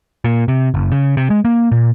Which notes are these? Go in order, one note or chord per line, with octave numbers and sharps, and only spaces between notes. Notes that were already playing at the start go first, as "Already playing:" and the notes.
A#2
C3
F#1
C#3
C3
G#3
A#3
A#2